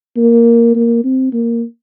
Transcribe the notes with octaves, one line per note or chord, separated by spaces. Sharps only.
A#3
A#3
C4
A#3